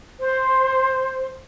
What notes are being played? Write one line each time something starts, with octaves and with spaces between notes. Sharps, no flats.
C5